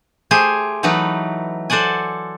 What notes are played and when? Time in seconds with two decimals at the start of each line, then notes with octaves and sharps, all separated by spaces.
0.31 A3 G4 G#4 C5 G#5
0.83 E3 F#3 A3 D#4 B4
1.70 A4 C5 D5 F#5 G#5